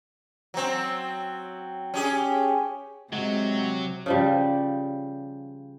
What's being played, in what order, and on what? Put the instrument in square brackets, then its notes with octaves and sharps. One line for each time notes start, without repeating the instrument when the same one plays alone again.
[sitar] F#3 C4
C#4 G4 G#4
[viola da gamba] C3 [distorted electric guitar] F#3 [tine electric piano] G#3
[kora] C#3 F3 G3